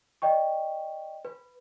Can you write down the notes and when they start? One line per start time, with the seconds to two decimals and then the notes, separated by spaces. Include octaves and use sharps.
0.22 D5 D#5 G5 C#6
1.25 B4